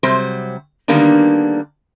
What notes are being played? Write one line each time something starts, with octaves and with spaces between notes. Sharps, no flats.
C3 F#3 G3 C5
D3 D#3 G3 A#3 B3 D4